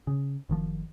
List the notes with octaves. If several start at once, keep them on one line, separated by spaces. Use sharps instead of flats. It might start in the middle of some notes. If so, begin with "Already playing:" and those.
C#3
F#1 D#3 F3